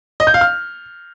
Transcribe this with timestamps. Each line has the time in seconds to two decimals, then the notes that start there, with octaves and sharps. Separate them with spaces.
0.20 D#5
0.27 G6
0.34 F5
0.41 F6